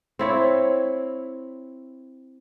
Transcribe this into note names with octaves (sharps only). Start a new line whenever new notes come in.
C4 E4 C#5